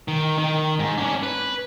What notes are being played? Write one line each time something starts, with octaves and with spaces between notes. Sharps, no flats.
D#3
D#3
G#2
C#4 D4
B4